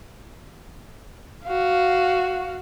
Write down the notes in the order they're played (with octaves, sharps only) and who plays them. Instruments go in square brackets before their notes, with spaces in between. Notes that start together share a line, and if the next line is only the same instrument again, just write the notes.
[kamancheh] F#4 F5